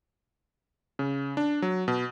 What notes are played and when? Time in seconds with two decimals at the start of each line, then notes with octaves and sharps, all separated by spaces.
0.99 C#3
1.37 D4
1.62 F#3
1.88 B2